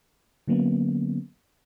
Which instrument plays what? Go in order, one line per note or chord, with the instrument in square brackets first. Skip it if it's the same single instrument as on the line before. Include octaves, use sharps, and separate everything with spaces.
[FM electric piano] D3 F#3 A#3 B3 C#4